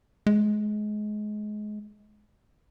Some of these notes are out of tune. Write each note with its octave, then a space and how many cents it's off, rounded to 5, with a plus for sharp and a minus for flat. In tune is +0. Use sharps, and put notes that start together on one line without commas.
G#3 +25